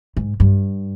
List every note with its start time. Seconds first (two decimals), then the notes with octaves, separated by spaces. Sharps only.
0.17 G#2
0.40 G2